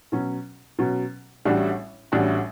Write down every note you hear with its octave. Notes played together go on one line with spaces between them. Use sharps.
B2 F#3 C#4
B2 F#3 C#4
A1 A2 G3 D4 F#4
A1 A2 G3 D4 F#4